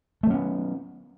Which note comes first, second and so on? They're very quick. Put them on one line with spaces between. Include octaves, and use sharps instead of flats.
A3 F#3 C#4 B3